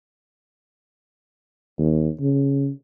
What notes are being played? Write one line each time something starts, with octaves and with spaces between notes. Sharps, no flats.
D#2
C#3